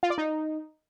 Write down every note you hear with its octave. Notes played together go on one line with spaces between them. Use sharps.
F4
D5
D#4